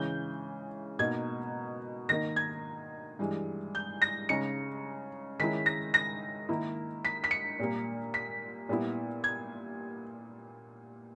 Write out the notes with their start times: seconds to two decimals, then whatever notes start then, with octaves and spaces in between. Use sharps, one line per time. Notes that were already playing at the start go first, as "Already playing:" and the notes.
Already playing: C#3 E3 G#3 G6
0.99 B2 A#3 D#4 G#6
2.09 D#3 A#3 D#4 A#6
2.36 G#6
3.19 G2 E3 G#3
3.75 G6
4.02 A#6
4.29 C#3 G#3 D#4 C#7
5.39 D#3 G#3 C#4 E4 B6
5.66 A#6
5.94 A#6
6.49 D#3 A#3 E4
7.05 B6
7.24 B6
7.31 C#7
7.59 A#2 G3 A#3
8.14 B6
8.69 A#2 G3 B3 E4
9.24 G#6